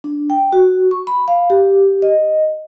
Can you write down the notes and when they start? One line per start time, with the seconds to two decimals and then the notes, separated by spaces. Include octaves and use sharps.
0.04 D4
0.30 G5
0.53 F#4
0.91 C#6
1.07 B5
1.28 F5
1.50 G4
2.02 D#5